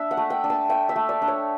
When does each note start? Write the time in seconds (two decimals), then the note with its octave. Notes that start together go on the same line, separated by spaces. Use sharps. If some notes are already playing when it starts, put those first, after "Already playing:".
Already playing: D4 E5
0.11 F#5
0.17 A3
0.30 G5
0.44 D4
0.50 A5
0.69 A3 G5
0.89 E5
0.96 A3
1.09 D5
1.22 D4
1.28 C#5